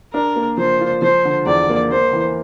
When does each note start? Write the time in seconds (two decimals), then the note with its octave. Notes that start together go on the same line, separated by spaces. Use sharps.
0.14 D4 A#4
0.36 A#3
0.58 F3 C5
0.81 F4
1.02 F3 C5
1.25 D3
1.46 E2 D5
1.69 A#3
1.91 A#3 C5
2.13 E3